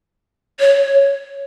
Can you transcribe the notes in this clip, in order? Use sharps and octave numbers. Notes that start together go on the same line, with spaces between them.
C#5